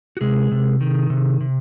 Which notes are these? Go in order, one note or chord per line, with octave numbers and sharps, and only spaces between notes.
F#4
C3 G#3 G#4
C3
D#3
C3
C3